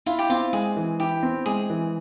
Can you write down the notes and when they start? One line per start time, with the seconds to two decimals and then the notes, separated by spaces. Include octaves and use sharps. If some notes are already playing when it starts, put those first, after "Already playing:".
0.06 E4 F4
0.19 G4
0.30 C4 F4
0.53 G#3 G#4
0.76 E3
1.00 E4 G4
1.23 C4
1.46 G#3 G#4
1.70 E3